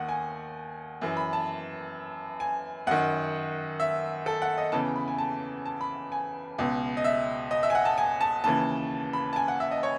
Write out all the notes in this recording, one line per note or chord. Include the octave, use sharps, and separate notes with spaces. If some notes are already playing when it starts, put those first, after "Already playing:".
Already playing: D#2 D#3 F#5
G#5
F#2 E3
B5
A5
G#5
F#2 D#3 F#5
E5
A4
F#5
D#5
E2 C#3 E3 A5
B5
G#5
A5
A5
B5
G#5
C#2 B2
D#5
E5
D#5
E5
G#5
F#5
A5
G#5
A5
D#2 C#3 E3 A5
B5
A5
G#5
F#5
E5
D#5
C#5